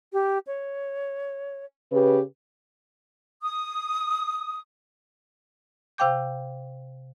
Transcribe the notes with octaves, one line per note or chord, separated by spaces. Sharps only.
G4
C#5
C#3 G4 B4
D#6
C3 C5 F5 G5 D6 G6